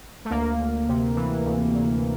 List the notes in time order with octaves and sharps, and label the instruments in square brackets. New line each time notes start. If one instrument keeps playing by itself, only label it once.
[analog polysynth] A3
D2 A#3
D2
C3
E3
D2
D2